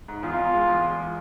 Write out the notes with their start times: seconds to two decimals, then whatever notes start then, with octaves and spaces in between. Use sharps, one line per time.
0.08 G#2
0.23 E2 F4
0.38 E2
0.54 G#3
0.68 E2
0.83 G#3